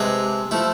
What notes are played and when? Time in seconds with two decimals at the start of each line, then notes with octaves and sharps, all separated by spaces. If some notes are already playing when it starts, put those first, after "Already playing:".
Already playing: C3 G#3 D4 G#4 B4
0.51 F3 A3 E4